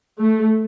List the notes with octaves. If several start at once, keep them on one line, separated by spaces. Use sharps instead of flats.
A3